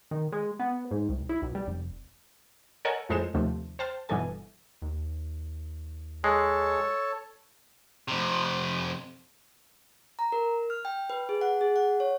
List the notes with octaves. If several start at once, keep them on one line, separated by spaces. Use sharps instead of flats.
D#3
G#3
B3
G#2
C2
E4
B1
G3
F1
A4 A#4 C#5 D#5 F#5 G#5
F2 A2 G#3 A4 C5 E7
D#2 C3 F3 A3
C5 G5 A5 F6
G1 B2 E3 B3 A4 G#5
D#2
G#3 A4 C#5 A5
F2 C3
A#5
A#4
F6
G5
B4
G#4
F#5
G#4
F#5
C#5